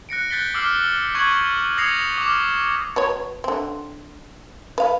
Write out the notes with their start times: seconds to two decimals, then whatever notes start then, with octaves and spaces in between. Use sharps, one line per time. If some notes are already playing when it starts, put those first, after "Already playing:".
0.09 F#6 A#6 C#7 D7
0.30 F#6 G6 A6 B6 G7
0.54 D6 E6 F6 C7
1.15 C#6 F#6 G#6 F#7
1.77 D#6 G#6 A#6 C7 C#7 F7
2.18 D6 F6
2.96 F#3 B4 C#5
3.44 D3 C4
4.78 B4 F5